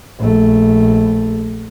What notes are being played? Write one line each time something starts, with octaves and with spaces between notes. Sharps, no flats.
A#1 A3